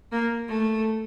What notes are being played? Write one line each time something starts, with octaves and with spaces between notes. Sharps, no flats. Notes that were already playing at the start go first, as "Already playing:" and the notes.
A#3
A3